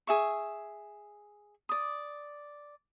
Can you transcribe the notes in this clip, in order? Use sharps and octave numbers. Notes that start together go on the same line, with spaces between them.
G#4 E5 C#6
D5 D#6